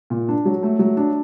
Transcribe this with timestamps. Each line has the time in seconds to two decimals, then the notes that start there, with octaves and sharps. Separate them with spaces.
0.10 A#2
0.29 D4
0.45 F#3
0.63 A3
0.79 F#3
0.97 D4